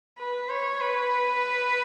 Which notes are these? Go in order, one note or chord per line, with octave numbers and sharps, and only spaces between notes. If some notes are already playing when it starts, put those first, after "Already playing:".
B4
C#5
B4